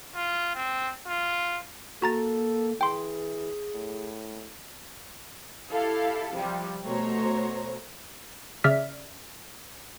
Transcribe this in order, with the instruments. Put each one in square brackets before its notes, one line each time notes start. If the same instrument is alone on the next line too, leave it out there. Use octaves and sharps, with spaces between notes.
[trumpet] F4
C4
F4
[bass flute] A#3 [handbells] F#4 A#5 A6 [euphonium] A4
[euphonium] E3 [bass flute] G#4 [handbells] G5 C6
[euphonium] A2
[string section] E4 G4 A4 F5
C3 F3 G3
B2 A3 F#4 C5 C#5 A#5
[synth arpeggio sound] C#3 D5 E5 F6 B6